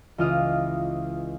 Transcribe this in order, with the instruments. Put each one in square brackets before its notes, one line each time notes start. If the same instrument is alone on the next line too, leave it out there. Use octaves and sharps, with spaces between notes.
[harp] C#2 E3 F4 D#5 F5